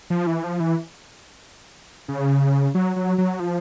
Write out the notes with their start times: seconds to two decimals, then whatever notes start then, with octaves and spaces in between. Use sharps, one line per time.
0.10 F3
0.27 E3
0.44 F3
0.60 E3
2.08 C#3
2.75 F#3
2.96 F#3
3.18 F#3
3.40 F3